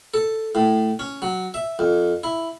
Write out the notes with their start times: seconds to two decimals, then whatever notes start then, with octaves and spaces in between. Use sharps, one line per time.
0.14 A4
0.55 A2
0.99 C#4
1.22 F#3
1.54 E5
1.79 F2
2.23 E4